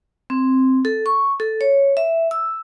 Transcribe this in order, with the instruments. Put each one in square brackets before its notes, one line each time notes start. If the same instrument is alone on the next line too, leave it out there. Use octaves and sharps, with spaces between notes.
[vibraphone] C4
A4
C#6
A4
C#5
E5
E6